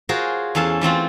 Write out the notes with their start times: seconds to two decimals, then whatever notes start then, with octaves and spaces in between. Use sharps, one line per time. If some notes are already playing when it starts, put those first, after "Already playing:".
0.09 F4 F#4 G#4 A#4 C5 C#5
0.55 E2 C#4 A4 F5 A5
0.81 E3 A3 C4 F4